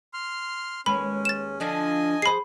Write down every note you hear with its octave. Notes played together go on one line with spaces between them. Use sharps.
C6 F6
D#2 G#3 C#4 B4 B5
A6 E7
D3 F3 D4 D#5 G#5
G#4 C5 B5 C7